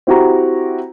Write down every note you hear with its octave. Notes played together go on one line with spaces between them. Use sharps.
C4 E4 F#4 G4 A#5